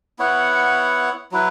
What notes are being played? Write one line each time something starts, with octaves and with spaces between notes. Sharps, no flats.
B3 E4 C#5 F#5
F#3 E4 B4